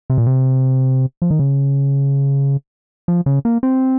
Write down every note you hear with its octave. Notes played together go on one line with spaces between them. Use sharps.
C3
A#2
C3
F3
D#3
C#3
F3
C#3
A#3
C4